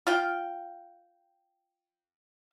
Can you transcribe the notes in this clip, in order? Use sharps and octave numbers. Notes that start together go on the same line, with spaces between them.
F4 F5 G5